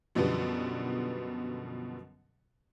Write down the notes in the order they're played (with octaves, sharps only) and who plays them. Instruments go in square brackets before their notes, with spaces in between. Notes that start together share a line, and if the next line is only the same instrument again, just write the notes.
[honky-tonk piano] F#2 B2 D3 F3 G3 B3